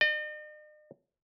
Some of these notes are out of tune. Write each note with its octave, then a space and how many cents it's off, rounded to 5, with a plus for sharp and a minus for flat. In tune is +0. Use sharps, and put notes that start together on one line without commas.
D#5 -45